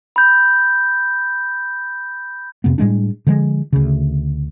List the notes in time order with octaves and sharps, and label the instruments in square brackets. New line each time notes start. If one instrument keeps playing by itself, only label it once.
[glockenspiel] B5 G6
[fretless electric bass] F2 C3 A#3 B3
A2 G3 G#3 D4
D3 F3 G#3
D2 C#3